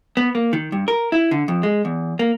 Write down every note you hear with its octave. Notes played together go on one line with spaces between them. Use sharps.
B3
A#3
D#3
G2
A#4
E4
D3
F2
G#3
E2
A#3